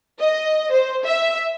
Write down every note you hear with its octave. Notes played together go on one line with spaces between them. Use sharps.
D#5
C5
E5